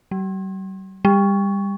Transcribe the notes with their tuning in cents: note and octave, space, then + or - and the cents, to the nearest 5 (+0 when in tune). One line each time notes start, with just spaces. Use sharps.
G3 -45
G3 +25